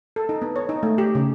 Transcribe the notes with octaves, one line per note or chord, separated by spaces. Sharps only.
A4
D#4
B3
C#5
D#4
A3
G4
C#3